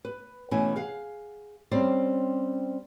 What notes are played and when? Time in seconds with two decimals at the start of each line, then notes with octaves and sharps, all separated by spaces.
0.05 B4
0.51 B2 E3 A3 C#4 G#5
0.76 G#4 F5 F#5
1.71 G3 C4 C#4 G4 C5 D5